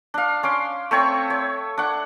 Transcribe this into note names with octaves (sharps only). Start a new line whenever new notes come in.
D4 F5
C#4 C6 D6
A3 C4 C#5 C#6
C#5
D4 F#5